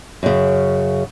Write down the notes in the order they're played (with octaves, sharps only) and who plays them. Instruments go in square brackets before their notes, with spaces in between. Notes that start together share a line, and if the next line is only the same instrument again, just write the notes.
[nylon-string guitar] F#2 C#3